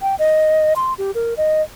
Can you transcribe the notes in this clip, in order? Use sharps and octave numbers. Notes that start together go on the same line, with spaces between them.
G5
D#5
C6
G4
A#4
D#5